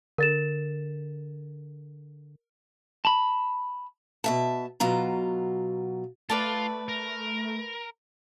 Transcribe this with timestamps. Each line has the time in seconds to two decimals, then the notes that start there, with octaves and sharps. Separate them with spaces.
0.18 D3 A#4 A6 E7
3.05 A5 B5
4.24 B2 E5 A5
4.80 B2 F#3 F4 A#5
6.29 A3 F4 B4 D5 F5 A5
6.89 A#4